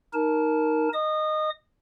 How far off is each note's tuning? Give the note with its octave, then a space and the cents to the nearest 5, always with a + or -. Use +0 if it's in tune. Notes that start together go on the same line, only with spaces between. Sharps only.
D#4 +0 A#4 +5 A5 -20
D#5 -10 D#6 -25